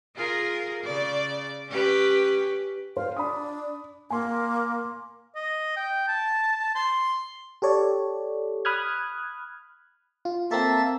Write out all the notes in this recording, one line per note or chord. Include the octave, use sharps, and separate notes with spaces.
F4 G#4 A#4
C#3 D5
C#4 G4 B4
C5 F5
D4 B5 D#6
A#3 G#5 C6
D#5
G5
A5
C6
G4 A4 C#5 D5
B5 D#6 F6 F#6 G#6
F4
A#3 C4 A4 E5 A5